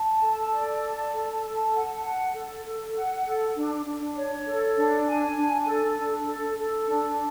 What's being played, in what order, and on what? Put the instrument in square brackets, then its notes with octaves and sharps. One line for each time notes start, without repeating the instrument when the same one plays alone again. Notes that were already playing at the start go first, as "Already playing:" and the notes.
Already playing: [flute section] A5
A4
D5
A5
A4
A5
F#5
F#5
A4
A4
F#5
A4
D4
D4
C#5
A4
D4
G#5
D4
A4
D4
A4
A4
D4